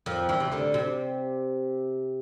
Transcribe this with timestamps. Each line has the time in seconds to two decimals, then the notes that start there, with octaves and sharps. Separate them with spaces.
0.06 F2 F3
0.29 E2 E3
0.40 C3
0.52 D2 D3
0.74 C3